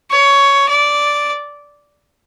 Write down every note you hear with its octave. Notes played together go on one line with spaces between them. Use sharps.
C#5
D5